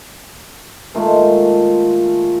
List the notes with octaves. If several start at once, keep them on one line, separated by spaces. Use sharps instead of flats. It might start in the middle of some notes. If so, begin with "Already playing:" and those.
A#2 D#3 G#3 A3